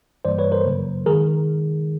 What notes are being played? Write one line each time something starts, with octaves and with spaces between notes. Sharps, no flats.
G2 E3 G3 A#3 C5 D5
B4 C#5
A#4 C5
F#2 C#3 F#3 A#3
D#3 G#3 G#4 A#4